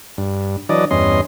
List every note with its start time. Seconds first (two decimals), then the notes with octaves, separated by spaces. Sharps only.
0.18 G2
0.69 E3 F#3 D4 D5 D#5
0.91 E2 G2 C#4 D#5 C6